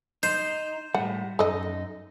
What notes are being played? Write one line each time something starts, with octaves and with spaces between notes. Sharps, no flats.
D#4 C5
A2 G3 F#5
F#2 D#4 A4 D#5